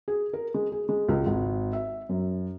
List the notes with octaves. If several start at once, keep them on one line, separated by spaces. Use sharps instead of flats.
G#4
A#4
G#3
G#4
G#3
C#2
G#1
E5
F#2